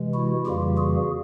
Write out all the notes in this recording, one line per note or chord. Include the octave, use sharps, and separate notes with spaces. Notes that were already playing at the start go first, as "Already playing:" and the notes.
Already playing: C3 E3 G#3
E4 F#4
F2 C#3 E3 G3 A#3 F4 G4
F#4 G#4